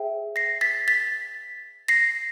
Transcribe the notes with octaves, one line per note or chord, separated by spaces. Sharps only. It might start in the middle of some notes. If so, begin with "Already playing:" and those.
Already playing: G#4 C5 E5 G5
A#6 C7
A6 B6
A6 B6
A#6 C7